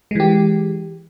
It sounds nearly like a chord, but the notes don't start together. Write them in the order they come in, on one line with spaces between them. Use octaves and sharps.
G#3 E3 G4